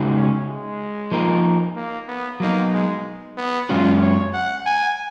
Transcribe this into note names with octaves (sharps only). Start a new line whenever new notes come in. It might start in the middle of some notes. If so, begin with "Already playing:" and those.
Already playing: C#3 G#3 D#4 F#4
C#4
G#3
F3 A#3 D#4 A#4
A#3
B3
F#3 A#3 B3 D#4
G#3
B3
F#2 C#3 G#3 C#4 F4 F#4
C#5
F#5
G#5